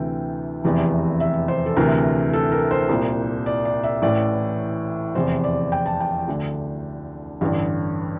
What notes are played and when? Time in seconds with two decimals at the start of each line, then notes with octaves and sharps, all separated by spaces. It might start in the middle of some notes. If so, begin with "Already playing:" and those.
Already playing: D2 C3 E3 G5
0.64 F1 E2 C3 E3
1.20 E5
1.48 C5
1.66 A4
1.76 D2 C3 E3 A#4
2.33 A4
2.52 A#4
2.71 C5
2.89 C2 A#2
3.46 D5
3.65 D5
3.84 E5
4.02 A1 A2 E3 D5
5.15 F1 E2 C3 C5
5.44 D5
5.72 G5
5.86 A5
6.00 G5
6.28 D2 D3
7.41 A1 G2 D3